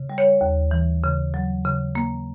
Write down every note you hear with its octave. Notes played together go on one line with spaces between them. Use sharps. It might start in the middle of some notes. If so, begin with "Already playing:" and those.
Already playing: C#3
G3
C#5
D#2
E3
C#3
F#3
C#3
A#3